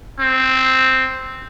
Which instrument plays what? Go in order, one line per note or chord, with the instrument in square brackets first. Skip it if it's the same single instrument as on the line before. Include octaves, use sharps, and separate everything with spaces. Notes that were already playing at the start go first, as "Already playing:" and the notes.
[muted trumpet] C4